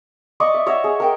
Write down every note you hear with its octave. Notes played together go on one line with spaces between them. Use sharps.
D5 D#5 C#6 D6
E5
C#5 D#5 E5 F#5
G#4
A#4 G5